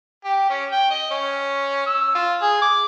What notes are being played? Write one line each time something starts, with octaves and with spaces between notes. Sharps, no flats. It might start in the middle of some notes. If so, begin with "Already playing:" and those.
G4
C#4
G5
D#5
C#4
E6
F4
G#4
D6